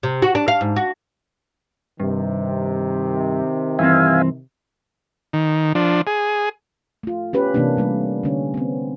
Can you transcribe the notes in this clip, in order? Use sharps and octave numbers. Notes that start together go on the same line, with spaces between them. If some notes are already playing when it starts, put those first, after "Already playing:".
C3
F#4
D4
F5
G#2
F#4
G2 C3 D#3
G2 E3 C4 E5 F5 G#5
D#3
F3 D4
G#4
A3 F4
C#4 G4 B4
C3 E3 A#3 C#4 D4
C3 G3 A3
D3 C#4
B3 C4